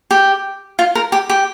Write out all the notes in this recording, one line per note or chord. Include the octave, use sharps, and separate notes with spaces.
G4
F4
A#4
G4
G4